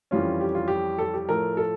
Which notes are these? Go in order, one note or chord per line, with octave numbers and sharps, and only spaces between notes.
F2 E3 G3 C#4 F4
G4
F4
G4
A4
G4
A2 F3 A3 A#4
A4